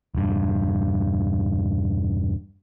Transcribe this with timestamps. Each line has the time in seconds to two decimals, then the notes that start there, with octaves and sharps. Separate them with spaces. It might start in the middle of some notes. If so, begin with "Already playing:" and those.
0.15 E1 G2